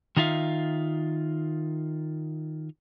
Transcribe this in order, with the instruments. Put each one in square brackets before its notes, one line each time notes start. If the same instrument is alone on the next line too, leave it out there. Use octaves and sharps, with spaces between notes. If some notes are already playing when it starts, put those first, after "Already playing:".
[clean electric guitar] D#3 D#4 F4 E5 F5